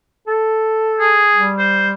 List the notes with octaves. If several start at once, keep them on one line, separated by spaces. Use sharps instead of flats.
A4
G#4
G3
C5